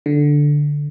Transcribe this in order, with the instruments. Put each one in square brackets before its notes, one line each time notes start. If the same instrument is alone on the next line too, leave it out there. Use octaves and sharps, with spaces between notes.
[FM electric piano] D3